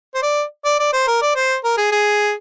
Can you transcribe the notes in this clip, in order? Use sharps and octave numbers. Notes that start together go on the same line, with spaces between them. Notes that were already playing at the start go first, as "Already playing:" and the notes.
C5
D5
D5
D5
C5
A#4
D5
C5
A#4
G#4
G#4